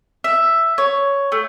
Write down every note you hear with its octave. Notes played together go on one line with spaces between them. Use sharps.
E5
C#5
A3